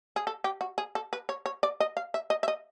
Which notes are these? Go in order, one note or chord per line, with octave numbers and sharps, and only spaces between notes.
G#4
A4
G4
F#4
G#4
A4
B4
C#5
C#5
D5
D#5
F5
E5
D#5
E5
D#5